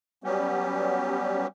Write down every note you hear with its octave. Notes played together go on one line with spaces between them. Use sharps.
F#3 G3 B3 C#4 G4